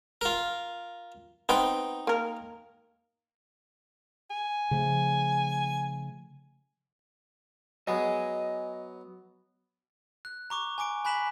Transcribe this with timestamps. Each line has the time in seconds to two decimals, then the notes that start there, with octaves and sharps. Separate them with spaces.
0.21 F4 A#4
1.49 B3 C4 D#4 G5
2.07 A#3 A#4
4.30 G#5
4.71 C#3 F3 A3
7.87 F#3 B3 D#5 G#5
10.25 F#6
10.50 A#5 C#6 D6
10.78 G#5 A#5 D6 D7
11.05 G#5 B5 F#6 B6 E7 F#7